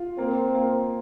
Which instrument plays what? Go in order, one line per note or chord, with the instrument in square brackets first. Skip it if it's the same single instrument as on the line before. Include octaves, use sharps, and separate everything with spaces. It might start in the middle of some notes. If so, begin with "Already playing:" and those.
Already playing: [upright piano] F4
[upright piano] A#3 [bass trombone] C4
[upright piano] A#3